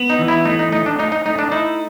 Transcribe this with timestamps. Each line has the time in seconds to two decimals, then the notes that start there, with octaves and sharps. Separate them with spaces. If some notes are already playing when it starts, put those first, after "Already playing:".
Already playing: B3
0.10 D#4
0.19 E3
0.28 E4
0.45 A3 D#4
0.59 D#4
0.72 A3 D#4
0.86 D4
0.99 D#4 F4
1.12 D#4
1.26 A3 D#4
1.39 D4
1.51 D#4 E4